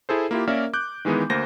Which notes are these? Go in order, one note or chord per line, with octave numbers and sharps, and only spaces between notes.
E4 G#4 A4 C5
A#3 E4 F4 G4
A#3 C#4 A#4 D5 E5 F5
D6 F#6 G6
D#3 E3 G#3 B3 D#4
D2 A#3 C5 G6 A#6